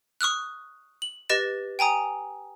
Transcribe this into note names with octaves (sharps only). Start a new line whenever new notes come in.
C#6 D#6 F6 F#6
F#7
G4 B4 D#5 A6 A#6 E7
G5 G#5 A#5 D#6